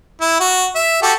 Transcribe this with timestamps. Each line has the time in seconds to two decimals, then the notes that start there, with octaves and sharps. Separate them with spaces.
0.21 E4
0.40 F#4
0.75 E5
1.02 F#4 G4 A4